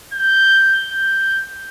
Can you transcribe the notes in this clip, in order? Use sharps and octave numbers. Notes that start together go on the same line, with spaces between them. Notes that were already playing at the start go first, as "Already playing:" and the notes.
G6
G6